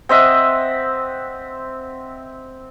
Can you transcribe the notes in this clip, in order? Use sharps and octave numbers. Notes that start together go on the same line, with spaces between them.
C4 D#5 E5 F#5